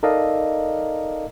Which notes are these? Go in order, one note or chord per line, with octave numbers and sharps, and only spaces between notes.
D#4 A4 A#4 D5 D#5 F5